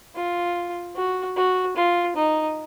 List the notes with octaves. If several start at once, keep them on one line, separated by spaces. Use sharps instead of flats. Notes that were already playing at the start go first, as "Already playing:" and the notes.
F4
F#4
F#4
F4
D#4